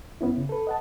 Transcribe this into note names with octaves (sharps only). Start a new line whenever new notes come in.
F2 B3 C#4 E4
C#3
A4 B4
D#5 F#5 A5